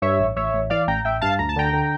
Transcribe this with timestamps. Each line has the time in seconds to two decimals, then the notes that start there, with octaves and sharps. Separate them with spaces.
0.02 G2 C#5 E5
0.19 A1
0.36 A1 C#5 E5
0.54 A1
0.70 E3 D5 F5
0.87 A1 G5 A#5
1.04 A1 E5 G5
1.21 G2 F5 A5
1.39 D2 A#5
1.49 A5
1.56 D3 G5 A#5
1.73 D3